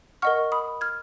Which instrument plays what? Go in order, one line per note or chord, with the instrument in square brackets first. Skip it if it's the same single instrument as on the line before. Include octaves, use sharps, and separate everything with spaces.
[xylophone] A#4 D#5 F#5 C#6 F6
B5 D#6
F6 G#6